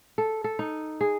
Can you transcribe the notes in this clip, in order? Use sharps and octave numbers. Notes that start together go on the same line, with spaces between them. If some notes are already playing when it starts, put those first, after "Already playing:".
A4
A4
D#4
G#4